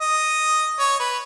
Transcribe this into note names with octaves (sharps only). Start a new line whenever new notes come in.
D#5
C#5
B4